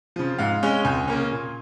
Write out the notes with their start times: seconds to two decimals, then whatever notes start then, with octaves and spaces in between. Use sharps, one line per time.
0.16 C#3 F3
0.38 G#2 F5
0.63 G#3 C#4
0.85 C#2 G#5
1.08 C#3 A#3 C#4
1.31 A#2